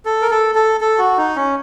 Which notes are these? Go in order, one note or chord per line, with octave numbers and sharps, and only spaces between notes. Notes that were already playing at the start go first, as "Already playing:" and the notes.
A4
A#4
A4
A4
A4
F#4
D#4
C#4